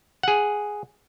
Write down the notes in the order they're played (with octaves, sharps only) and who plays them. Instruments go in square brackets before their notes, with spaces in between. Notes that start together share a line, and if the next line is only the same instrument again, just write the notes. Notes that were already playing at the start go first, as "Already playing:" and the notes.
[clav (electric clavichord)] G#4 F#5